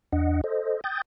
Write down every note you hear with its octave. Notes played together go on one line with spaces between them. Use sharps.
E2 D4 D#5 F#5
A4 C5 D#5
G5 D#6 G6 A6